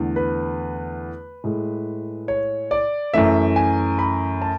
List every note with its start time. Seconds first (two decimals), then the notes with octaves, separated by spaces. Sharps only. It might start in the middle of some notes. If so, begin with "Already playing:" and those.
Already playing: E2 D3 A3
0.16 B4
1.44 A2 G#3
2.28 C#5
2.71 D5
3.14 F#2 E3 A3 E5
3.56 G#5
3.99 B5
4.42 A5